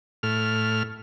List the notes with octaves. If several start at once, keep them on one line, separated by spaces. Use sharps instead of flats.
A2 F6